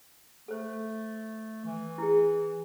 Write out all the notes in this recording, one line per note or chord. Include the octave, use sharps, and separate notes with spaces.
A3 A4 C5
E3
E4 G#4